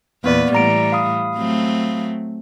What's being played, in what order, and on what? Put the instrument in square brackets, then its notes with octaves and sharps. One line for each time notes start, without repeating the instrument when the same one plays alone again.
[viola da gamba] E2 A#2 B4 [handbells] A#3 B3 D5
[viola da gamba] A2 E3 G3 [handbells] D5 A#5 D7
[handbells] F5 B5 D#6
[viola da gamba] F#3 A3 C4